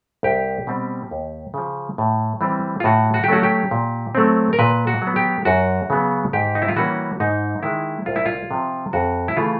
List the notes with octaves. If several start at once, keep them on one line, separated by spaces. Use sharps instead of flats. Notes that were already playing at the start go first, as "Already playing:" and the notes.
C2 G4
B2 G3 C4
D#2
C#3 F3
A2
E3 G3 C4
F4
A2 F#4
F#4
G4
F#3 A3 C#4 F#4
G4
A#2
F#3 A3 C4
A#4
A#2 B4
F#4
F#3
B3
G4
F#2 F#4
C#3 F#3 B3
G#2 G4
D#4
E4
F4
E3 G3 A#3 C#4 F#4
G#2 D#4
D#3 G#3 E4
C2 F4
E4
F4
C3 F3
F2 F#4
E4
C#3 E3 A3 F4